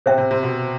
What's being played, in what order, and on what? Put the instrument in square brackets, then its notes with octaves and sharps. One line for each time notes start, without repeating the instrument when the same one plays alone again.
[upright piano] C3 [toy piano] C5 E5 G5
[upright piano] C3
C3
B2